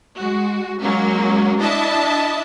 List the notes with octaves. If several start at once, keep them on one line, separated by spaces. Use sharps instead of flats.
G#3 F#4
F#3 G#3 A#3 C#4
D4 E4 D#5 E5 A5